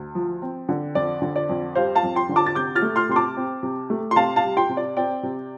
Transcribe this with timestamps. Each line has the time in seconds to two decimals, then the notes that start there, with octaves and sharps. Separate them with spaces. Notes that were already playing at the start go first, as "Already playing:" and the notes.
Already playing: D2
0.15 F3
0.42 C4
0.69 D3
0.95 F2 D5
1.22 D3
1.36 D5
1.49 F2
1.75 G3 C5 F5
1.95 F5 A5
2.03 F2
2.15 G5 C6
2.29 D3
2.36 A5 D6
2.46 A6
2.55 C3 D6 G6
2.75 F6 A6
2.82 A3
2.96 C6 F6
3.09 C3 C6
3.16 A5 D6
3.37 C4
3.63 C3
3.90 A3
4.11 C6
4.16 C3 F5 A5
4.36 F5 A5
4.43 G3
4.57 G5 C6
4.69 C3
4.77 D5
4.97 C4 D5 G5
5.23 C3